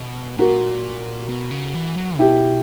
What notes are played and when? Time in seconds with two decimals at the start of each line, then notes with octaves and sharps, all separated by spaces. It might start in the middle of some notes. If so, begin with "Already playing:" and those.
Already playing: B2
0.38 A#2 F#4 A#4
1.29 B2
1.51 C#3
1.74 E3
1.97 F#3
2.18 B2 E4 G4